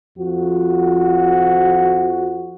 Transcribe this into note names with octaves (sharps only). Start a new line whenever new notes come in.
F2 F3 F#4